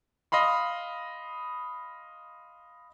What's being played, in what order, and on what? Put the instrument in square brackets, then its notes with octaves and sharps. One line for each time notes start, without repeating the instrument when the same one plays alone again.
[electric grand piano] D#5 F5 B5 C6